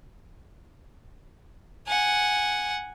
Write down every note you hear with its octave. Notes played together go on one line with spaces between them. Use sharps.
F#5 G#5